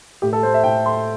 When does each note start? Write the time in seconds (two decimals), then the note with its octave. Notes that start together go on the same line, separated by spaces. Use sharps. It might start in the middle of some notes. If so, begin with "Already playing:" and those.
0.22 A2 G4
0.33 A4
0.43 A3 C5
0.54 E5
0.64 A2 G5
0.85 A3 C6